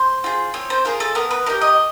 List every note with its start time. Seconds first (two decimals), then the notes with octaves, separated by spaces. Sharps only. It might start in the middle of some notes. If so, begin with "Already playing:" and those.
Already playing: C5
0.24 F4 G#4
0.54 C4 C#5
0.70 C5
0.85 F4 G#4 A#4
1.00 A4
1.15 B3 A#4
1.31 B4
1.46 D#4 A#4
1.50 G4
1.61 D#5